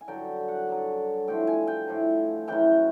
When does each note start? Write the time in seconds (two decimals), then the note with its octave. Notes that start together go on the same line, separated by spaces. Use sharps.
0.01 G#5
0.08 G2 D3 F#3 G5
0.48 F#5
0.68 G2 D3 F#3
1.28 A2 F3 G5
1.47 G#5
1.67 G5
1.88 A2 F3
2.48 F#2 C#3 E3 G5